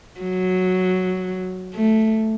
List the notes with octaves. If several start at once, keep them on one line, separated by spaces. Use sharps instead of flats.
F#3
A3